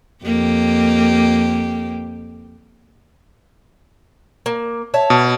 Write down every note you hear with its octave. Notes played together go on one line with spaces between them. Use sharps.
F2 A#3 G4
A#3
C#5 E5 A5
B2